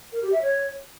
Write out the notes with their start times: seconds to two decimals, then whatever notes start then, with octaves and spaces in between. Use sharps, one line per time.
0.13 A#4
0.22 G4
0.32 E5
0.42 C#5